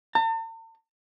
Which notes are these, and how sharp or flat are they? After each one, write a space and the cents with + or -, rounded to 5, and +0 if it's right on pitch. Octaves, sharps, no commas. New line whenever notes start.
A5 +45